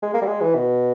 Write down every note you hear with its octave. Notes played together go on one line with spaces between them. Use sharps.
G#3
A#3
G3
G#3
E3
B2